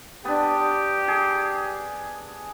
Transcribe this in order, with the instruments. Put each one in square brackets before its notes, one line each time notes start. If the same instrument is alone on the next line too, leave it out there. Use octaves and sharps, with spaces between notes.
[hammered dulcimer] B3 D4 [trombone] G4
[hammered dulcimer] G#4